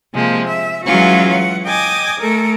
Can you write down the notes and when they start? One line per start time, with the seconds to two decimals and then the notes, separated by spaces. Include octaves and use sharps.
0.14 C3 F3 G#3 A#3
0.47 E5
0.86 E3 F#3 G#3 C#4 F4 F#4
1.31 F#5
1.66 D#5 G5 G#5 D6 D#6
2.21 A3 A4 A#4